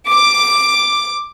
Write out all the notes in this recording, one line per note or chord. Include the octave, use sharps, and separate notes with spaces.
D6